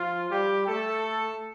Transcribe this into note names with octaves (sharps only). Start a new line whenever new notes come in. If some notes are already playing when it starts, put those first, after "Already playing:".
Already playing: F3 F4
G3 G4
A3 A4